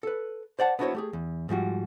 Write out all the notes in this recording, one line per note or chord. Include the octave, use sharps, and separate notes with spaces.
A4 B4
C5 D5 F#5 A5
B3 D4 E4 F#4 C5 C#5
A3 G4 G#4
E2
G#2 F3 G3 F#4